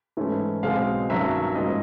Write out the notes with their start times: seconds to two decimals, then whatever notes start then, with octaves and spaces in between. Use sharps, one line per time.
0.17 G#2 E3 A3 C#4
0.63 B1 B2 G#3 C4 F5
1.09 G2 D#3 F#3 A#3 C#4 E5
1.55 G#2 F3 A#3 C#4 D#5